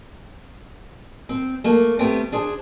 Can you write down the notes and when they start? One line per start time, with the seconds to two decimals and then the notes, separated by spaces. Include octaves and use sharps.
1.29 C4
1.64 A3 A#3
1.99 G3 A3 B3 C4 G5
2.32 D4 G#4 C5